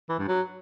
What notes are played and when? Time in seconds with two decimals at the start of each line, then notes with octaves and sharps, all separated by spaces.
0.09 E3
0.19 G2
0.28 F#3